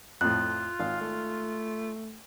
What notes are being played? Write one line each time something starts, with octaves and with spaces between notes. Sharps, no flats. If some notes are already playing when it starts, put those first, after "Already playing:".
F2 A2 F4 F#6
G#1 F5
A3